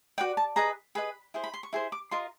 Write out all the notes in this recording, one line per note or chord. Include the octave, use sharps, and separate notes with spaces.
F#4 B4 D5 G5
A5
G#4 B4 D#5 A#5
G#4 B4 D#5 B5
E4 G#4 C5
B5
C6
C#6
E4 G#4 C5
D6
F4 A#4 D#5 C6